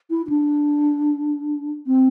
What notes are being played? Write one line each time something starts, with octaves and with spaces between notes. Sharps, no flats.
E4
E4
D4
C4